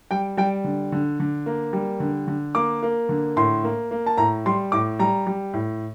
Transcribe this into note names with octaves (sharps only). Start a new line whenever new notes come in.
G3 G5
G3 G5
D3
D3
D3
A#3
G3
D3
D3
A#3 D6
A#3
D3
A2 C6
A#3
A#3
A5
A2 A#5
G3 C6
A2 D6
G3 A#5
G3
A2